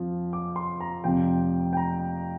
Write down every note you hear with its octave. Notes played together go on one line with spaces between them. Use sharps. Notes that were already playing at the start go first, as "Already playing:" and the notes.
Already playing: F2 F3
D6
C6
A#5
F1 F2 F3 G5
G5
A#5